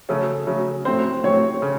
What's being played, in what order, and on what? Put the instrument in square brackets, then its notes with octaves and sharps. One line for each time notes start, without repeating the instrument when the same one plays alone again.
[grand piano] C#3 F#3 A3 C#4 [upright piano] A4
[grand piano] C#3 F#3 A3 C#4
[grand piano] A2 F#3 A3 C4 [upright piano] C5
[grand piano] A2 F#3 A3 C4 [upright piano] C#5
[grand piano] C#3